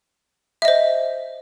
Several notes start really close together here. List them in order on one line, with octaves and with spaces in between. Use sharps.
E5 D#5 C5